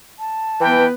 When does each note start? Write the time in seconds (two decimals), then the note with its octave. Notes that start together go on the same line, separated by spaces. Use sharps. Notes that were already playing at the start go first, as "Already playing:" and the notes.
0.19 A5
0.61 E3 B3 B4 G5